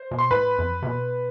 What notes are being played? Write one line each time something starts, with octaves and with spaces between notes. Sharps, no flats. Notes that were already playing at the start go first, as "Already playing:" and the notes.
Already playing: C5
B2
C6
A2 B4 B5
F2
C3
B2